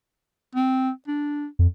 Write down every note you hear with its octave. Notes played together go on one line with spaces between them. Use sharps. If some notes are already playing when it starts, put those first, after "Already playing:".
C4
D4
F2